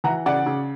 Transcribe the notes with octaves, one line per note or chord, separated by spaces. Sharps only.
E3 F#5 A#5
C#3 D5 F#5
C#3